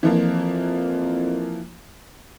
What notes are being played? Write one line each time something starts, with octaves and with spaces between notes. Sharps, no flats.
F2 E3 F3 A#3